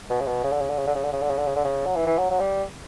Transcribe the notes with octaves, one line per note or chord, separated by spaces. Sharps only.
B2
C#3
B2
C#3
D3
C#3
D3
C#3
D3
C#3
D3
C#3
D3
C#3
D3
C#3
D3
C#3
F#3
E3
E3
F#3
F#3
G3